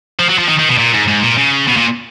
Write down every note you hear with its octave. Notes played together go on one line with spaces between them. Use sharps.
F3
F#3
F3
D#3
D#3
B2
A#2
G#2
G#2
A#2
C#3
B2
A#2